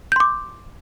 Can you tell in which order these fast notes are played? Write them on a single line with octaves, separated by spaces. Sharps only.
G6 C6 D6